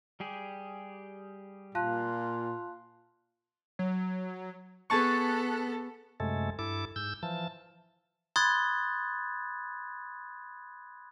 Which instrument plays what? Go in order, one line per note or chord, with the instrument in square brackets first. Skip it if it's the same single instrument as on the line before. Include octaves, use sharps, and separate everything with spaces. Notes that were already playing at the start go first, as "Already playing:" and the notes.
[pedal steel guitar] G3 G4 G#4
[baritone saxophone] A#2 [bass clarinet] F4 [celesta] F5 A5 F#6
[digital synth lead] F#3
[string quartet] B3 A4 [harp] G#4 A5 C#6 [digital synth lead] F#6
[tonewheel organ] F#2 C3 G#3 A3 A4
G2 E4 A4 D6
G#2 E6 G6
E3 F3 A5
[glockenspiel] B5 C6 D#6 F#6 G#6 A6